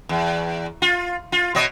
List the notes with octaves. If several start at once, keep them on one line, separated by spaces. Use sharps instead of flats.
E2
F4
F4
B2 C#5 D#5